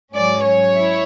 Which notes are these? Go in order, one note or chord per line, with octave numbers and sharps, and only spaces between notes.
G#2 F#3 C#4 D5
C#5
E4